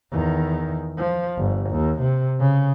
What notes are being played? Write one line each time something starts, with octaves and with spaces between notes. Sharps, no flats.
E2 D#3
F3
G1
D#2
C3
C#3